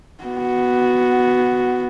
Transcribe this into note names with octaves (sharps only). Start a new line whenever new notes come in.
B3 F#4